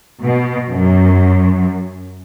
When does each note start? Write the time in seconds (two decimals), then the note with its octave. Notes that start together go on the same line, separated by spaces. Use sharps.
0.21 B2
0.69 F#2